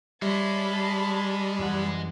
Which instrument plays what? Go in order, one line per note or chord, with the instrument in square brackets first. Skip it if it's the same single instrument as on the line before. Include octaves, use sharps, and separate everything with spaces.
[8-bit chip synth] G3 [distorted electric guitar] G#3 [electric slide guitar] C#5 E5 [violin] A5 B5
[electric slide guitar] F#2 E3 F#5